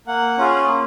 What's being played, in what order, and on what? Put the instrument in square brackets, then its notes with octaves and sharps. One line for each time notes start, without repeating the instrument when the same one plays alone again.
[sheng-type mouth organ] A#3 F#5
C#4 F4 G#4
A#3